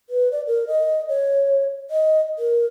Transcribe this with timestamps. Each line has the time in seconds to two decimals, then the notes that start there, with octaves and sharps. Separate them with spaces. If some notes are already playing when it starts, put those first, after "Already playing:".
0.10 B4
0.32 D5
0.47 A#4
0.68 D#5
1.09 C#5
1.90 D#5
2.39 A#4